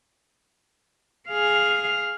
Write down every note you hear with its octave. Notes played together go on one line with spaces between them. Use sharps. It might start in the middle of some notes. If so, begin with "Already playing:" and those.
G#4 F5